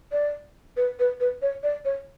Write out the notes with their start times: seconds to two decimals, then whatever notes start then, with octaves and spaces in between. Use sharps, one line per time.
0.12 D5
0.77 B4
0.99 B4
1.20 B4
1.42 C#5
1.63 D5
1.85 C#5